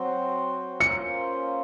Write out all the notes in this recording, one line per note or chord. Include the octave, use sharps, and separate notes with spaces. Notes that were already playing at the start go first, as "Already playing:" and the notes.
Already playing: F#3 C4 F#4 C5
A#3 C#4 F4 C5 C#7